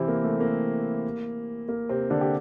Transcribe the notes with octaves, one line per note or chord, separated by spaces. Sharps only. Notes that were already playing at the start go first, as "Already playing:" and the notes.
Already playing: C3 E3 C4 E4
A#3
A3
A#3
A#3
C3 C4
D3 D4
G4